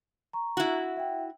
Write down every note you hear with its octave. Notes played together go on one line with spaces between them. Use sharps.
A#5 C#6
E4 F#4
E5 G5